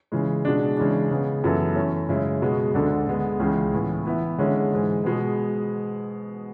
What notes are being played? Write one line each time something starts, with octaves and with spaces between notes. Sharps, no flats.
C#3 E3 G#3
B2 G#3 D4
C#3 E3 G#3 D4
C#3 G#3 B3
F#2 E3 B3 E4 A4
E3 A3 C#4
F#2 C#3 G#3 C#4 E4
B2 G#3 B3 F#4
D2 D3 G#3 D4 A4
D3 G#3 B3
C#2 C#3 E3 G#3
A2 E3 B3
E3 B3 E4
D3 G#3 C#4 E4
G#2 E3 G#3
B2 G#3 B3